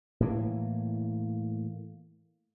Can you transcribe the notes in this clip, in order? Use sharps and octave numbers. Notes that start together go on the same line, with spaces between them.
A2 E3 A#3